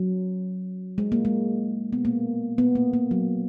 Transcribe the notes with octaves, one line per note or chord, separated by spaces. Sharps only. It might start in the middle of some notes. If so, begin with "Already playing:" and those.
Already playing: F#3
G#3
A#3
G#3
B3
A#3
B3
A#3
A#3
F#3